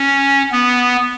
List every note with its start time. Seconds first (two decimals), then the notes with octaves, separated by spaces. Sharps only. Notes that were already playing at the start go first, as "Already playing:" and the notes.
Already playing: C#4
0.52 B3